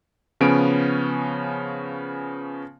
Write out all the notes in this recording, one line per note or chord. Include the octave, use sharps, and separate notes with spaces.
C#3 F3 B3 C#4 D7